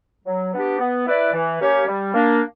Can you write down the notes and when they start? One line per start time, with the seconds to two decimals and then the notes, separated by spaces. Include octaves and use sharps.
0.25 F#3
0.52 B3 D4 G4
0.78 B3
1.06 E4 B4 D5
1.33 E3
1.60 A#3 C#4 G4 C#5
1.87 G3
2.14 A#3 D4